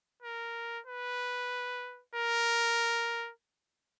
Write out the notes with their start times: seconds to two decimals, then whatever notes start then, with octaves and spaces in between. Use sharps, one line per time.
0.22 A#4
0.86 B4
2.15 A#4